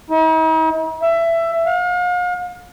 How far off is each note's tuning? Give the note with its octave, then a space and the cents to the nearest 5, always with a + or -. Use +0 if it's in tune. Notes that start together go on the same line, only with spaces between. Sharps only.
D#4 +45
E5 +15
F5 +40